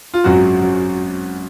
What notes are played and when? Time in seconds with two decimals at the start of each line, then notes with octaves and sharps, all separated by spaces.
0.14 F4
0.24 G#1 F#2 C#3 F#3 F#4
0.61 C#3 F#3